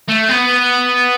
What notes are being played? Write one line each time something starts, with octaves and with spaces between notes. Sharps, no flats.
A3
B3